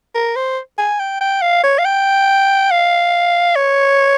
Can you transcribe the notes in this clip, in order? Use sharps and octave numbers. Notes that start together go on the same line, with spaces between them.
A#4
C5
G#5
G5
G5
F5
C#5
F5
G5
F5
C#5